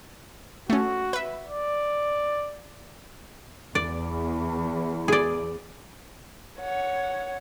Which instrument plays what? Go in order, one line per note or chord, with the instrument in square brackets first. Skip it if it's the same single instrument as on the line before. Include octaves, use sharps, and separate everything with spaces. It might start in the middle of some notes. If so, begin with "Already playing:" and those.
[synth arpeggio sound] A3 C#4 [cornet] F#4
[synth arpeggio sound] B4 E5
[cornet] D5
[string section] E2 [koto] D5
[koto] G#4 D5
[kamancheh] C#5 F#5